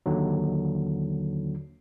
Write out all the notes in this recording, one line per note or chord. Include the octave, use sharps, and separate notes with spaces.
D#2 D3 F#3